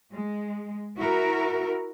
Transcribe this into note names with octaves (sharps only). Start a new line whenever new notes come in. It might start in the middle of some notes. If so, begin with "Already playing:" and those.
G#3
E4 F#4 A#4